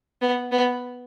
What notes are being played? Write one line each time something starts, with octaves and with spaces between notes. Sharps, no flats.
B3
B3